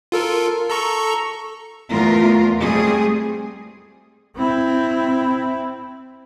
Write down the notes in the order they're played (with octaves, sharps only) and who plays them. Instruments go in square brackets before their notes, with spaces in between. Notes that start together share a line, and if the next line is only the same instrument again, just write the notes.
[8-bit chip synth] F4 A4 A#4
A4 A#5 C#6
[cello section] E2 A3 F4 A#4
G3 A3 C4 G#4
[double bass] C4 E4